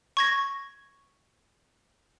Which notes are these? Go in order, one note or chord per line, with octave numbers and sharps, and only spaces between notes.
C#6 G#6 A#6